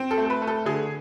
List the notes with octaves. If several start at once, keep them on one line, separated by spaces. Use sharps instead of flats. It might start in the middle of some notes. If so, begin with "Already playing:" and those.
Already playing: C4
A4
A3
A4
B4
A3
A4
D3 G#4